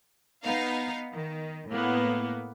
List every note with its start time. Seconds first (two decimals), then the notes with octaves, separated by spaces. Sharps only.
0.43 B3 D#4 F5
1.13 D#3
1.69 A2 A#3 B3